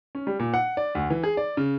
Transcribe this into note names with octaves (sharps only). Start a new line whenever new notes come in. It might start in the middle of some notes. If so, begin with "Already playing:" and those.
C#4
G3
A#2
F#5
D5
D2
E3
G#4
D5
C#3